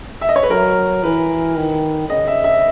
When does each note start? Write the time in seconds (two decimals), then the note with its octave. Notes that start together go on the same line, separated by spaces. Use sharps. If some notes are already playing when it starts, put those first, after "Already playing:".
0.21 E5
0.29 D#5
0.36 C#5
0.43 B4
0.50 F#3 A#4
1.04 E3 B4
1.57 D#3
2.09 C#3 D#5
2.27 E5
2.44 E5